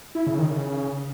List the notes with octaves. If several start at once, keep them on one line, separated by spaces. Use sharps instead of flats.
E4
C#3
D#3
C#3
C#3